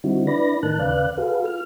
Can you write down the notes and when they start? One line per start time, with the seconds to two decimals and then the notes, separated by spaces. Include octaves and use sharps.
0.04 D3 G3 C4 D#4 E4 F#4
0.27 D4 E4 B4 D5 B5 A#6
0.63 A2 D#3 D#4 A#4 A5 F#6
0.79 D#2 C#3 B4 D5 F5 F#6
1.18 F#4 G#4 A4 B4 F5
1.45 F4 F6